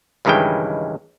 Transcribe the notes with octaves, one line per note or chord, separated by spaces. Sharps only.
C#2 G2 D#3 E3 G#3 G5